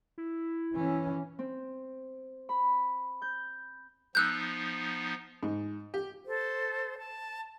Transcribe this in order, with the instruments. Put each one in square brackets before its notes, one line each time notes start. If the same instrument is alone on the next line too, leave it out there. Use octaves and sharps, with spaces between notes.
[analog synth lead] E4
[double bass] E3 C#4
[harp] C4
B5
G6
[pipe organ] F3 B3 D#4 [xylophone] E6 F#6 G6
[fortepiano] G#2
G4
[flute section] A4 C5
A5